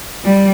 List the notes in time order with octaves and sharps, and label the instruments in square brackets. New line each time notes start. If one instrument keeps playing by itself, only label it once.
[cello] G3